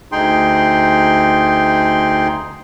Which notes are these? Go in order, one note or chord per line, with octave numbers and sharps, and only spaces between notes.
D2 D#4 G#4 G5 C6